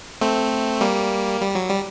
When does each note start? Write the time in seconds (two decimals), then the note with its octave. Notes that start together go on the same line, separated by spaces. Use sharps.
0.21 A3 C4
0.81 G3 A#3
1.41 G3
1.55 F#3
1.70 G3